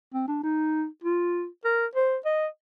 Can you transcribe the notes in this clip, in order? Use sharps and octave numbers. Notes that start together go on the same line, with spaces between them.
C4
D4
D#4
F4
A#4
C5
D#5